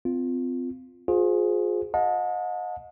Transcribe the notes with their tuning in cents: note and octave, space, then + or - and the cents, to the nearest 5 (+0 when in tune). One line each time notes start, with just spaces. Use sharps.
C4 -30 F4 +0
F4 +35 G#4 +5 C5 -10
D#5 +10 F#5 -45 A5 +0